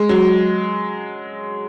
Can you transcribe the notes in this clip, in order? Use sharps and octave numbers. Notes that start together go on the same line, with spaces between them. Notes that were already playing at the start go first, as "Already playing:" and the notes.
Already playing: G#3
F#3